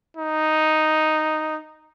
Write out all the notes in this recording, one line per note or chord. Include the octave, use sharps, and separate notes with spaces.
D#4